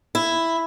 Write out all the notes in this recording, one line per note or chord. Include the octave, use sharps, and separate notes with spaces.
E4